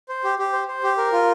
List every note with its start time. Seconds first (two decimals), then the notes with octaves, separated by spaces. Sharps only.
0.09 C5
0.24 G4
0.39 G4
0.53 C5
0.68 C5
0.84 G4
0.97 A#4
1.12 F4